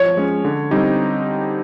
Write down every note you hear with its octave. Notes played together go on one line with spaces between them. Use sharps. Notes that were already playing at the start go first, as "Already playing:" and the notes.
Already playing: F3 C#5
G#3 C#4
D3
G3 C4 D#4 G4